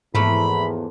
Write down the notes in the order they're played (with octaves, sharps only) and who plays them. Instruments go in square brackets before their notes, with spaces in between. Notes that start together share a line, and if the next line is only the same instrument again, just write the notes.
[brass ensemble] E2 [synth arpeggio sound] G#2 [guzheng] F3 A3 A#3 [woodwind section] E5 B5